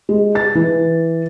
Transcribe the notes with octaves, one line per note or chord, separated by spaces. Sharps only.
G#3
A6
E3